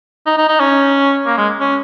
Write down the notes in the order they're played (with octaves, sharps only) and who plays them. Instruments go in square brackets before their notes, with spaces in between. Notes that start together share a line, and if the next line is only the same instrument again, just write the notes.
[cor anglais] D#4
D#4
D#4
C#4
A#3
G#3
C#4